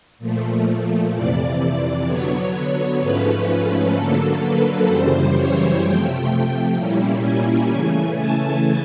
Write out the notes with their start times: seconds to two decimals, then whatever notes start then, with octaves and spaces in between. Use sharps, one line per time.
0.19 A#2 F3 A3
1.13 F2 C3 E3 D5
2.06 D3 F#3 B3 C#5
3.00 G#2 F3 A3 C#4 B4
3.93 D3 F#3 A#3 A4
4.40 B4
4.87 F#2 C#3 E3 G3 C5
5.33 C#5
5.80 C3 F3 A3 G5
6.74 A#2 G3 A#3 C#4 E4
7.21 G#5
7.68 C#3 E3 A3 G#5
8.14 A5